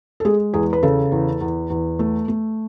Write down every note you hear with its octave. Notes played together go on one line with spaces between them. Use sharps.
A4
G#3 G#4
E2 G#4
B4
C#3 A4
E2
E2
E2
A3
A3